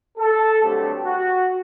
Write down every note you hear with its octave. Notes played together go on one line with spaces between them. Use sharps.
A4
G2 D3 F#3 A3 C4 G4
F#4